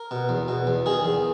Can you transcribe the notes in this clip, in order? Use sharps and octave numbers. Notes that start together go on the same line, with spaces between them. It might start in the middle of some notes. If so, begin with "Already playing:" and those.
Already playing: A#4
B2
E2
B2
E2
D#3 G#4
E2